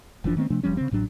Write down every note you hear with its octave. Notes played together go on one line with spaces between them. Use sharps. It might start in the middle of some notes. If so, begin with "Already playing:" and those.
F1 E3 F3 D4
D#3 A3 B3 C4
C3 F3 A3 D4
F1 F3 G3 C#4
C#3 C4
A1 A2 F#3 D4